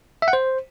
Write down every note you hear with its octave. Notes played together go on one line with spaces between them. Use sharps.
E5
F#5
C5